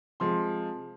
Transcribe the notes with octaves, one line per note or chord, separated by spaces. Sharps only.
C3 F3 G#3 C4 C6